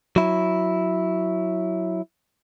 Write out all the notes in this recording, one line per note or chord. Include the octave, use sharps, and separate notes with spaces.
F#3 E4